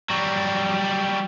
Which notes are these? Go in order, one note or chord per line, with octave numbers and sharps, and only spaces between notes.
F#3 G3